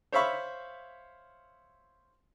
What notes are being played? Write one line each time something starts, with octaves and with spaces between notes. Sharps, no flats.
C5 C#5 E5 F5 B5 C#6